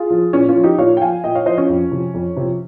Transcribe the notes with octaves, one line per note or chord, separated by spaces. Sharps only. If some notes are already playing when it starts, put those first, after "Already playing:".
Already playing: F4 G#4
F3
A#2 C#4
C#4 F4
F3
D#4 G4
A#2 C#5 F5
G5
F3 F5 G#5
A#2 D#5 G5
C#5 F5
F3 C5 D#5
C#4 F4
F2
C3 F3
F2
C3 F3